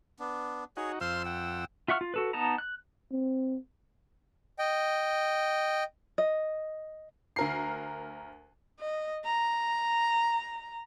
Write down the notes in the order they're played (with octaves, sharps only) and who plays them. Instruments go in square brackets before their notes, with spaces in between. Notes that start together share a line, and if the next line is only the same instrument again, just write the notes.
[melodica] B3 D4
[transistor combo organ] D#4 F#4 [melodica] G#4 C#5
[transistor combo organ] F2 E6 [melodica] C5 F5 C6
[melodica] F#5 G5
[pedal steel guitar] F4 E5 F#5 C#6 F6
F4
F#4 A4 B4
B3 D#4 A5 A#5
F#6
[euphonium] C4
[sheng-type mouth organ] D#5 G5
[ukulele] D#5
[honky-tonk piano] D2 A#4 C7
[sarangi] D#5
A#5